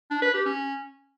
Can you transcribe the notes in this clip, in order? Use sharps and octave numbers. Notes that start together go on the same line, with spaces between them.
D4
B4
G4
C#4